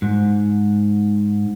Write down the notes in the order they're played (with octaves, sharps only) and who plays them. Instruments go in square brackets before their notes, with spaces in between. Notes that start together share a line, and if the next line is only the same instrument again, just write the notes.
[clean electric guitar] G#2